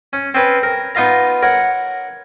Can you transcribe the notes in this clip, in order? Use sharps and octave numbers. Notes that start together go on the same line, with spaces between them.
C#4
C4 C#4 B4
A#4
B3 D#4 F4 F5 A#5
A#4 C#5 F#5